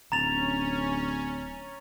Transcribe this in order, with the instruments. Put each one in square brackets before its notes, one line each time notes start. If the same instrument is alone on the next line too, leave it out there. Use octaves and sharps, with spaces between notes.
[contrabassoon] D1 [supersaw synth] C#4 [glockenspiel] A#5 A6 F7